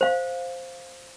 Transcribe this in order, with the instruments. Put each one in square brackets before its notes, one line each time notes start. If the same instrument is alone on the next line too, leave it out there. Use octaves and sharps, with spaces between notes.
[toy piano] C5 F5